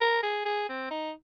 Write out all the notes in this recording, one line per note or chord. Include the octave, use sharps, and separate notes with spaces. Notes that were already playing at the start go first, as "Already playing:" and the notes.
A#4
G#4
G#4
C4
D#4